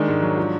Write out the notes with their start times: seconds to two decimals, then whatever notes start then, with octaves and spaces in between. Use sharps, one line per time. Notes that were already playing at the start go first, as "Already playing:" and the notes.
Already playing: D#3 G#3 D4
0.08 G#2
0.22 F#3
0.37 F3